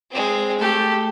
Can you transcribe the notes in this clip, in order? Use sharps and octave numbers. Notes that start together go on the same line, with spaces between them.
G#3 C4
A3 G4 A4